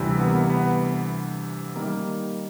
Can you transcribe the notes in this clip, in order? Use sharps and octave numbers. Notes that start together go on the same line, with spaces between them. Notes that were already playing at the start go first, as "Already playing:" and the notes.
Already playing: D2 C3 E3 G3
B3
A#3
B3
B3
D#3 G3 A#3